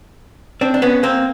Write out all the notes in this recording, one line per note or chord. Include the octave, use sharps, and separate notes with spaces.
C4 D4
D4
B3 C#4
A#3 C4